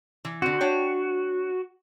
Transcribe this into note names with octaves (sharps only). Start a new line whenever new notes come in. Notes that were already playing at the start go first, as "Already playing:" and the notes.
E3
D3 C4 F#4
D4 C#5 G5